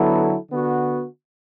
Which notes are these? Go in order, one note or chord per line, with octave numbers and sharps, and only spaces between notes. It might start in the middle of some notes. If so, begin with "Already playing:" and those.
Already playing: D3 F#3 B3 E4 A4
D3 B3 F#4